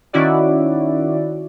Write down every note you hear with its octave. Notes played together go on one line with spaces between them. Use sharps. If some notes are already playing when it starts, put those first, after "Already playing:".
D#3 C#4 E4 F#4 D5